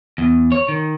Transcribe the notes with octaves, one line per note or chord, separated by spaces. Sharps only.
E2
C#5
D#3